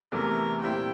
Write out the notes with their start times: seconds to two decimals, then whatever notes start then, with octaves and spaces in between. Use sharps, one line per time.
0.12 E2 C3 E3 A3 A#4
0.62 A#2 G3 C4 E4 G5